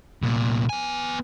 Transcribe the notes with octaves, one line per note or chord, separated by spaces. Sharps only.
C2 A#2
B3 G#5